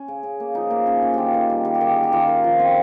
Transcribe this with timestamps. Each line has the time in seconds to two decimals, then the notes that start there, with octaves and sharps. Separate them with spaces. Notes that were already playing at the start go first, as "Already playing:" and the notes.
Already playing: C#4
0.08 C#3
0.23 C#3
0.40 A#3
0.55 F3 D#4
0.70 A#3
0.87 C#4
1.02 C#4
1.14 D#3 F4 G4
1.34 D#3
1.50 G3
1.65 G3
1.75 G4
1.81 D#3 G#4
1.97 D#3
2.03 G4
2.13 D#3 F4
2.28 D#3
2.44 F3
2.60 C4